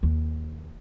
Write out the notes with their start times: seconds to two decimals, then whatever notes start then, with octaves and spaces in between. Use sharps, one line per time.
0.03 D#2